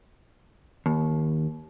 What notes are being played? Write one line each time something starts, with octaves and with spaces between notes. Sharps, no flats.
D#2